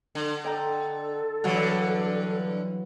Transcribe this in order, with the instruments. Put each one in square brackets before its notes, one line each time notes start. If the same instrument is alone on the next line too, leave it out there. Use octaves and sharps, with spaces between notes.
[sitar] D3
[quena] A4 [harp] D#5 G5 A#5
[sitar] G2 D3 [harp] E3 F#3 F#4